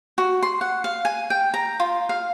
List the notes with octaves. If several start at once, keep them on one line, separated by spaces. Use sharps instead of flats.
F#4
C6
F#5
F5
G#5
G5
A#5
F4
F5